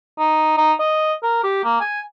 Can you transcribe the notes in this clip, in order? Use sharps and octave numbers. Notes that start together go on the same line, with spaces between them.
D#4
D#4
D#5
A#4
G4
A#3
G#5